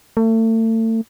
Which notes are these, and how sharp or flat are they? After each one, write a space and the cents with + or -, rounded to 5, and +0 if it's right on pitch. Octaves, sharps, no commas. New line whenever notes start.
A3 +35